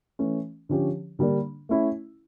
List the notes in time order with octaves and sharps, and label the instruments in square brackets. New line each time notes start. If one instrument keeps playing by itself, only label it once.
[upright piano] E3 A3 C#4
D3 F3 C#4 G4 C#5
D3 G3 A#3 D4
A3 C#4 E4